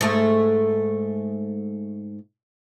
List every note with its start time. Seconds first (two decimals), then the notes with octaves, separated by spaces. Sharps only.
0.01 G#2 A3